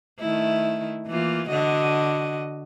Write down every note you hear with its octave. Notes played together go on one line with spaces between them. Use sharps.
D#3 A3 E4
E3 A#3 F4
D3 F#4 D#5